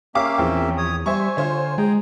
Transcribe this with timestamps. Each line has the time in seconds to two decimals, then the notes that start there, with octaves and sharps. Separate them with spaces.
0.15 A#3 C#4 G4 E5 F5 D6
0.38 A#1 E2 C4 G5
0.77 C#5 D#6
1.06 G3 C5 E5 G#5 C#6
1.37 D3 F4 C5 C#5
1.78 G#3 G#4 G5 A#5